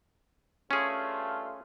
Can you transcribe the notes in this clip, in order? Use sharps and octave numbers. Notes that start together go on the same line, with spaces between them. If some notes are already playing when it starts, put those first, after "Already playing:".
G2 A3 C#4 F4 G#4